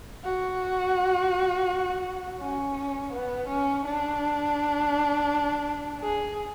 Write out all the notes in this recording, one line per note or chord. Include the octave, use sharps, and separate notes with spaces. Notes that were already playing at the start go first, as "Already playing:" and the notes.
F#4
C#4
B3
C#4
D4
G#4